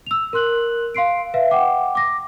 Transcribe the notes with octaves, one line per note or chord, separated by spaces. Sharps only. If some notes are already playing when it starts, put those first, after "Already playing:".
E6 F7
A#4 C6 F#6 F#7
F5 C6 C7 D7
B4 E5 F5
F#5 G5 D6
D6 A#6